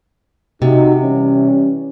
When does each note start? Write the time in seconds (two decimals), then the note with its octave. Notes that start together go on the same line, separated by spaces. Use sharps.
0.62 C3 D#4 F#4
1.01 E3 G3 C#4